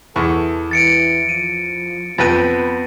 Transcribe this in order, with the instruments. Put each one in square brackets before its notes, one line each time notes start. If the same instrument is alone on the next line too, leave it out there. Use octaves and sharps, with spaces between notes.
[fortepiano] E2 C#6 [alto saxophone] A4
[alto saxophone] E3 [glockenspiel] A6 C#7 D7
[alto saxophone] F3 [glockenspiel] D#7
[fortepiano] F2 B4 G5 [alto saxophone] B3 [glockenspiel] A6 A#6 D#7